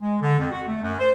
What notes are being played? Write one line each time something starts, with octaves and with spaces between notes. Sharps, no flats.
G#3
D3
F2
F#4
A3
F#2
C5